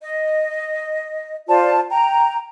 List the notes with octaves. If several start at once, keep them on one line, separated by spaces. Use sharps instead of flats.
D#5
F4 C5 D5 A5
G5 A#5